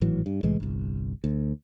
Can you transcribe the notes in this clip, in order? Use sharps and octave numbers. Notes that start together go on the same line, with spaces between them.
G#1 A2 E3 F#3
G2
C2 A2 E3 G#3
G1 C2
D2